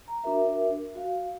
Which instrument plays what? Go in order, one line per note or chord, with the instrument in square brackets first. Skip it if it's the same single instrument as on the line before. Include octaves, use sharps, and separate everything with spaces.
[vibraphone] A#5
D4 F#4 A#4 E5
F#4 F5